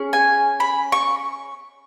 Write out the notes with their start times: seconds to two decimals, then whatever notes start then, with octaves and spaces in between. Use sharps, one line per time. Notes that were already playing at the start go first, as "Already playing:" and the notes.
Already playing: C#4 G#4
0.13 G#5
0.60 B5
0.92 C#6